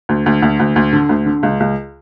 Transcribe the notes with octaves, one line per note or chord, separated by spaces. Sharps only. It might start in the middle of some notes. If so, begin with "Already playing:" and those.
D2
D2
D2
D2
D2
D3
D2
D3
C#2
C#2